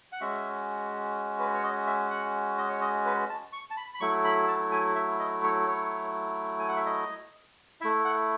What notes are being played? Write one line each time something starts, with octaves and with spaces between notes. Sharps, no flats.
F#5
G#3 C#4 F#4 E5
B4
C#5
D#5
E5
F#5
D#5
C#5
D#5
B4
A5
C#6
A5
B5
B5
F#3 A3 E4 C#6
B5
A5
G#5
E5
D#5
C#5
C#5
G#5
F#5
E5
D#5
A3 E4 E5
F#5